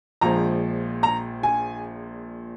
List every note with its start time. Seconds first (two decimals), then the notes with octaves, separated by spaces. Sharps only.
0.21 A#1 A#2 F3 G#3 A#5
1.03 A#5
1.43 G#5